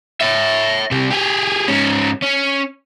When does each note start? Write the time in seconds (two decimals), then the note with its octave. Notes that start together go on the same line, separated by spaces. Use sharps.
0.21 C#5 E5
0.91 C3 G3
1.11 G4 G#4
1.68 G#2 C#4
2.22 C#4